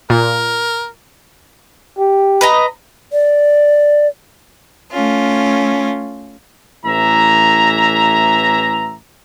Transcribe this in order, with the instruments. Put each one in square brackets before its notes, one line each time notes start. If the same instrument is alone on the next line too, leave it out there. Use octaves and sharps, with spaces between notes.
[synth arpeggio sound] A#2 [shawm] A#4
[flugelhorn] G4
[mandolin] B4 D#5 A#5
[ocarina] D5
[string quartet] A3 C#4 F4
[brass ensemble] A1 A2 E3 E5 A#5